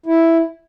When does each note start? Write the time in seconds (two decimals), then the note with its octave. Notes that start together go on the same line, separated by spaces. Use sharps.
0.06 E4